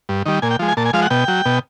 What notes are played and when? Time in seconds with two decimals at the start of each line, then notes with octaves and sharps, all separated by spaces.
0.09 G2
0.26 D#3 G3
0.42 A#2 G#5
0.51 G5
0.59 F3 G#3
0.68 G#5
0.77 A#2 A5
0.86 G#5
0.93 F3 G#3 F5
1.02 F#5
1.10 B2 G5
1.28 F#3
1.46 B2